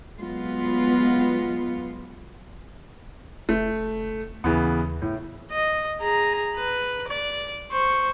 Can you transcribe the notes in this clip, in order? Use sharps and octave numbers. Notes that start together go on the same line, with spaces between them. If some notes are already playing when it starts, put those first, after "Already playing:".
F#3 G#3 B3 F4
F1 A3
D#2 C#3 E3 B3
A2
D#5
G#4 A#5
B4
D5
C5 C#6